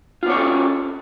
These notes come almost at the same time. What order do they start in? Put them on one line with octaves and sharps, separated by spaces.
F4 B3 C#5 C#4 A4